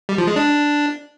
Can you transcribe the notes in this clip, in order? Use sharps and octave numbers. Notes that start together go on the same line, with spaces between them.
G3
F3
G#3
D4